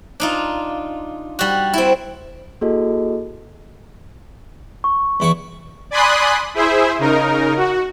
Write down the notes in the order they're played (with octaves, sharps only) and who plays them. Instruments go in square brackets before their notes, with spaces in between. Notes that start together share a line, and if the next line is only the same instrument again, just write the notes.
[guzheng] D4 D#4 F4
G3 F#4
C4 E4
[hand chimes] A#3 E4 F#4 G#4 A4 D#5
[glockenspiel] C#6
[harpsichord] E2 E4 C#6
[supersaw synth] D5 G#5 B5 C6 D#6 F#6
E4 G#4 C5 E5
C#3 D#4 A#4
F#4